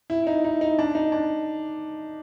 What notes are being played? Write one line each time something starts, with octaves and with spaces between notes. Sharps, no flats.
E4
D#4
D#4
D#4
D4
D#4
D4